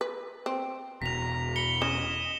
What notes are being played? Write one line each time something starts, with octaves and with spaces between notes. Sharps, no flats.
B4
C4
E1 B2 A#5 B6 F7
B5 C#7 G7
C#4 D#5 E7